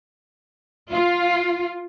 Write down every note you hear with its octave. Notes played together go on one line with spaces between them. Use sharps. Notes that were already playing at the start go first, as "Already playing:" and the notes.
F4